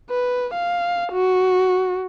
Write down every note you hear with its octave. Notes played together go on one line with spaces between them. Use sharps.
B4
F5
F#4